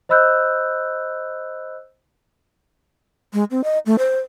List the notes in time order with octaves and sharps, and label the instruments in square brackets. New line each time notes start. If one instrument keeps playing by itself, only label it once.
[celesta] C5 D#5 B5 E6 F#6 G6
[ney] G#3
C4
D#5
A3
C5